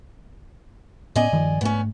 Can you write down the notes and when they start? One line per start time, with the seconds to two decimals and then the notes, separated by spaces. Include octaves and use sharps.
1.16 A2 B3 C#4 D5 D#5 G#5
1.32 G2 D#3 F3
1.61 G#2 A3 B3 C#4